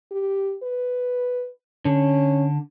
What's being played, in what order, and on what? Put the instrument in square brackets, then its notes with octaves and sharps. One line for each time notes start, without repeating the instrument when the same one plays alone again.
[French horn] G4
B4
[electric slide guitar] D3 [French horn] C#4